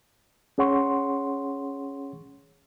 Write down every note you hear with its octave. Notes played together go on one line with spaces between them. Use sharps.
C#4 G#4 C#5 F#5 C6 C#6